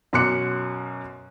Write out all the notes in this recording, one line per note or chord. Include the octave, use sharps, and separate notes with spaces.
F#2 B2 C6 D6 F#6 C#7